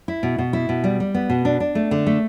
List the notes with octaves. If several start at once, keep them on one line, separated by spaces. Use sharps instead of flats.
E4
B2
B2
E4
B2
G3
G3
B3
B2
D4
D4
A3
D3
A3